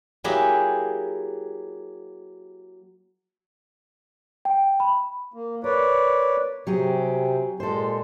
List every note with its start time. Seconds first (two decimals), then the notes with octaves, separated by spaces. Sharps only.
0.24 F#3 A#3 E4 G4 G#4
4.45 G5
4.80 B5
5.34 A#3
5.64 A#4 B4 C#5 D5
6.67 C3 F#3 G4 G#4
7.60 A#2 G#3 A4 C5